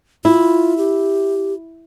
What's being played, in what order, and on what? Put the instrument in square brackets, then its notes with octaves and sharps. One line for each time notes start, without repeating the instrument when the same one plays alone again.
[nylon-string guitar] E4 [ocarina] F4
[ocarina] G4